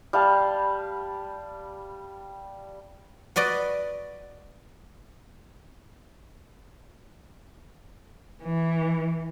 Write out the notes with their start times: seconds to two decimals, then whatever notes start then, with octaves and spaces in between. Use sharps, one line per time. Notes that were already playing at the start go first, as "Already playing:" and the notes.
0.13 G3 F5 A5
3.36 F#4 B4 D5 D#5
8.43 E3